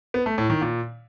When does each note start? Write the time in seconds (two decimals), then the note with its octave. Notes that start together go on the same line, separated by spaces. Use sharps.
0.14 B3
0.26 A3
0.38 A2
0.50 D#3
0.61 A#2